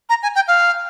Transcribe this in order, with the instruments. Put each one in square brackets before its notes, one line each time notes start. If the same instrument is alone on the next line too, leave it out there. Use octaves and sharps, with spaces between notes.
[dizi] A#5
G#5
G5
F5